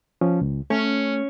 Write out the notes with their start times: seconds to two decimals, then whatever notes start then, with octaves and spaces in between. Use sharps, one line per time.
0.21 F3 C#4
0.41 C#2
0.70 A3 C#4